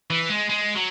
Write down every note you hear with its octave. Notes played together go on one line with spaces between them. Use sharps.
E3
G#3
G#3
F#3